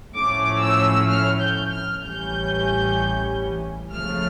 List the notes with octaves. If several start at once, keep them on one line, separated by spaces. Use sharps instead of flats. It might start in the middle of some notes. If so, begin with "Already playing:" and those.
A2 F3 A3 C#4 D6
E6
F6
G6
F6
A1 A2 E3 G3 C#4 G6
C#2 C#3 F3 A3 F6